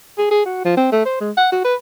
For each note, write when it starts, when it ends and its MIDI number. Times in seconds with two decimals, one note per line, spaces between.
0.18 0.30 68
0.31 0.42 68
0.46 0.60 66
0.65 0.75 53
0.77 0.90 60
0.92 1.05 57
1.05 1.17 72
1.21 1.31 56
1.37 1.48 78
1.52 1.61 66
1.64 1.75 71